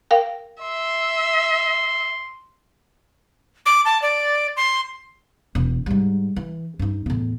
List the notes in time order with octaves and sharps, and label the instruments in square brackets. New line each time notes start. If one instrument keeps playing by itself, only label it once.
[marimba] A#4 F5 G5
[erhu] E5 [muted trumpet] C6
[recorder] D6
A5
D5
C6
[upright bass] E1
G#2 G3
E3
G2 D#4
E2 A2